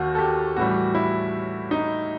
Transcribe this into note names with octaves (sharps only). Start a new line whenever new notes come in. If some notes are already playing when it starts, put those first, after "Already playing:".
Already playing: D#2 D#3 F#4
A4
G4
A2 E3 G3 F#4
E4
D#4